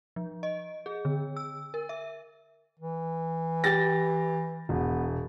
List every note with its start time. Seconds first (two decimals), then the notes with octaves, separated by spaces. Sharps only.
0.16 F3
0.43 D#5
0.86 G#4
1.05 D3
1.37 E6
1.74 A#4
1.89 E5
2.79 E3
3.64 G4 A6 A#6
4.69 E1 B3